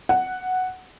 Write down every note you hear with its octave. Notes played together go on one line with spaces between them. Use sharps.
F#5